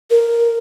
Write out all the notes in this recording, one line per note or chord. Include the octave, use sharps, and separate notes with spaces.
A#4